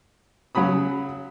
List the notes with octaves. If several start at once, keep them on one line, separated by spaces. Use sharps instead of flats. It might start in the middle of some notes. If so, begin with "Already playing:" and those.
C#3 F#3 F#4 B5 D#6